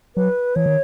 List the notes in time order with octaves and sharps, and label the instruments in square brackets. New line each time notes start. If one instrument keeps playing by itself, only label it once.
[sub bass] F#3 [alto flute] B4
[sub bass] E3 [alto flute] C#5
[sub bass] D#3